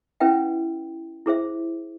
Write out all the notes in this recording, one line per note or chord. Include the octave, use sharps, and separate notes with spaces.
C#4 E4 B4 E5 G5
E4 G#4 C5 E5